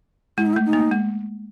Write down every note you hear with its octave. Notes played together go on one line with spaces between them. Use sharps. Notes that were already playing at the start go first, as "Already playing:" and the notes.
G#3 E4
D#4
E4
A3
D#4
A#3
G#3